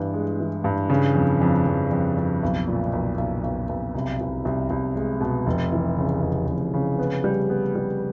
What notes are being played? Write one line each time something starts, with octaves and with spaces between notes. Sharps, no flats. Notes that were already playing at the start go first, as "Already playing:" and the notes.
Already playing: G2 E3 B3
G#3
E3
G2
C#3
F2
F2
F2
F2
F2
B1
A#2
B1
B1
B1
B1
C2
C2
C2
C2
G#3
B2
F1
E3
C#3
F1
F1
C#3
B3
G3
B3
G3